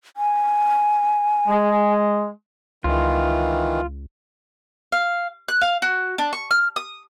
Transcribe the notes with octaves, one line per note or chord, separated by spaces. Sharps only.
G#5
G#3
C#2 D#3 E3 F4
F5
F#6
F5
F#4
D4
C#6
F6
D#6